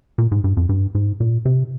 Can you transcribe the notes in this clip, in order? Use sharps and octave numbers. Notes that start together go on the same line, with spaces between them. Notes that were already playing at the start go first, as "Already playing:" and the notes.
A#2
G#2
G2
F2
G2
G#2
A#2
C3